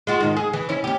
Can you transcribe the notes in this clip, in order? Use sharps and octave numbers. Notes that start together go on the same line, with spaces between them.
G#3 F4 F#4
G#2 D#3
G#4
E3
C#4 E4
C#4 G4